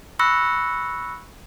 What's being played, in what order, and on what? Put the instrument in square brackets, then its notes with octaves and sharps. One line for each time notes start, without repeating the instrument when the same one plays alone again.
[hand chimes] B5 C#6 E6 F#6 A#6 C#7